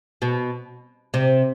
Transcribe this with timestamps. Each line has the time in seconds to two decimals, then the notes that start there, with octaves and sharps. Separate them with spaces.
0.22 B2
1.14 C3